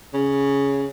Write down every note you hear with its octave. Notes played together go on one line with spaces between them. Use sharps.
C#3